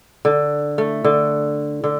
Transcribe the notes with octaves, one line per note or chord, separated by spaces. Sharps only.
D3
A3
D3
D3